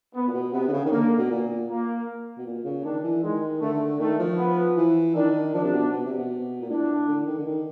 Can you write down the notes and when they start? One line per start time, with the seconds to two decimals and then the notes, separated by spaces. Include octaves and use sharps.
0.15 B3
0.27 A#2
0.34 B2
0.52 C3 B3
0.68 D3
0.72 C#3
0.85 D#3
0.91 D3 A#3
1.18 B2
1.30 A#2
1.68 A#3
2.38 B2
2.46 A#2
2.65 C#3
2.84 D#3 D4
3.03 E3
3.22 D#3 G#3
3.61 D3 A3
3.99 D#3 A3
4.19 F3
4.37 B3
4.76 E3
5.15 D#3 D4
5.54 F3 D4
5.64 C3
5.73 B2
5.92 B2
6.06 C3
6.18 B2
6.61 A#2
6.69 A2 D4
7.08 D3
7.27 D#3
7.38 D3
7.46 D#3